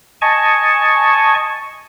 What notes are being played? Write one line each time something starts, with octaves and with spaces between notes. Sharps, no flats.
D#5 G#5 A5 C#6